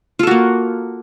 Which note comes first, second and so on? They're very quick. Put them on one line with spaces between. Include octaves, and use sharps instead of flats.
F4 A4 F#4 A#3